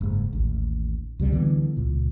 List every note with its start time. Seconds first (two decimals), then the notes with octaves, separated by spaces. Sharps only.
0.01 F#1 G#2
0.33 A1 D#2
1.19 C#2 C3 G3
1.32 D3 E3 G3 B3
1.77 C#2 A#2